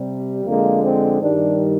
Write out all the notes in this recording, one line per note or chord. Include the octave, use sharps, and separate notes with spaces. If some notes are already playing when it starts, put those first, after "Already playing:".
Already playing: C3 G3
F2 D3 G#3 A#3
C4
G2 D#3 G3 D4